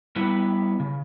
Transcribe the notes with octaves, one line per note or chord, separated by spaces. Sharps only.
G3 B3 E4 B4
C#3